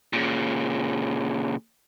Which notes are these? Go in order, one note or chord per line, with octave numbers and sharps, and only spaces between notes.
A#2 C#3